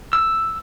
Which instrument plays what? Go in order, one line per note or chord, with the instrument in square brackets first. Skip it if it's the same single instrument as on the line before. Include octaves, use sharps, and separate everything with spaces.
[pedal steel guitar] E6